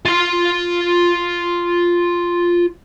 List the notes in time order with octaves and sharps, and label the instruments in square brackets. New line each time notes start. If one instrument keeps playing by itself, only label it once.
[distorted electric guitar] F4 C6